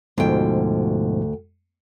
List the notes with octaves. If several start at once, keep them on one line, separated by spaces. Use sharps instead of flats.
D2 G#2 B2 F3 G5